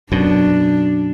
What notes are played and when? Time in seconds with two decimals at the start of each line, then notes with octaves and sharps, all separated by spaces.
0.12 F#2 B2 D4